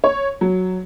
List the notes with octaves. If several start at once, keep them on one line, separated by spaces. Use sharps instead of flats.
C#5
F#3